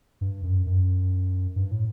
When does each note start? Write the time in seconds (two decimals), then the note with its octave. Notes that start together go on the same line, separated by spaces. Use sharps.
0.21 G2
0.43 F#2
0.66 F#2
1.56 G2
1.71 A2